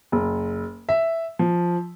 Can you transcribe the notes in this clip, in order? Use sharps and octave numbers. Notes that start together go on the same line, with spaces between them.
F#1
E5
F3